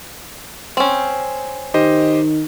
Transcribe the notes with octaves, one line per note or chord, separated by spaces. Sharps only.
C4 C#4
D#3 G4 C5 D#5